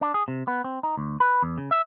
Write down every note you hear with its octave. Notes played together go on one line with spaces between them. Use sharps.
D4
G#4
C3
B3
C4
D#4
D2
B4
E2
C#3
E5